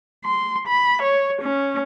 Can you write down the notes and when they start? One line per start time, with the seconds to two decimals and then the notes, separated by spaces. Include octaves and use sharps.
0.25 C6
0.68 B5
1.03 C#5
1.42 C#4